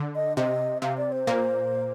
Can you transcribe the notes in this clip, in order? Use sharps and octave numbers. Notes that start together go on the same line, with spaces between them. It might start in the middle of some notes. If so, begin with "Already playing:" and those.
Already playing: D3
D#5
C3 D#5
C3 F5
D5
C5
A#2 A#3